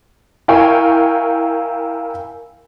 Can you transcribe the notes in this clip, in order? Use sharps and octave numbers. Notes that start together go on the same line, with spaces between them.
E4 A#4 F5 G5 G#5 C#6